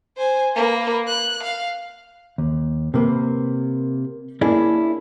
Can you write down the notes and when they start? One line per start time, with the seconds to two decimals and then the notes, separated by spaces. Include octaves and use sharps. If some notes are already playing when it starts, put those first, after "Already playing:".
0.17 C5 G#5
0.55 A#3 B4
1.07 F#6
1.43 F5
2.38 D#2
2.94 C3 A#3 B4
4.41 A#3 C#4 D4 E4 G#4 D5